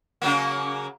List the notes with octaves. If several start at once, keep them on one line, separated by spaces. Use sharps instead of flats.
C#3 F#3 A#3